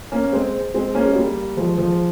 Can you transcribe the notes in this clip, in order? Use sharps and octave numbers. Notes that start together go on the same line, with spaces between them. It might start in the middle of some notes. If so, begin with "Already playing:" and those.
A#3 C#4
G#3 C4
G#3 C4
A#3 C#4
G#3
G3 A#3
F3 G#3
F3 G#3